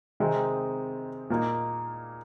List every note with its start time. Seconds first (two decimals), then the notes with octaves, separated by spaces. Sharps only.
0.20 C3 D#3 G#3 C4 D#4
1.30 A#2 A#3 D#4